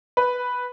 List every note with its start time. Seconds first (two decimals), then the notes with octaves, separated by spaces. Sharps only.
0.17 B4